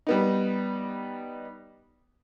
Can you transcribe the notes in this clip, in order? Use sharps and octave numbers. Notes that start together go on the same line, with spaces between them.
G3 B3 D#4